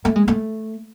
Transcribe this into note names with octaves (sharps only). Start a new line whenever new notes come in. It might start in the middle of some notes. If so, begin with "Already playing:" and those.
A3
G#3
A3